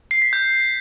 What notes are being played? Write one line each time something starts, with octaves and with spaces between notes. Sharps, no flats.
C7
B6
G6